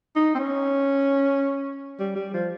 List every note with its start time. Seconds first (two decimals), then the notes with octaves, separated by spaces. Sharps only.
0.16 D#4
0.35 C4
0.39 C#4
2.00 G3
2.16 G3
2.34 F3